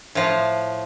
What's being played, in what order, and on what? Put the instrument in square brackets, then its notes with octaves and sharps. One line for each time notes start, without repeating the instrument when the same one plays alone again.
[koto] A2 F3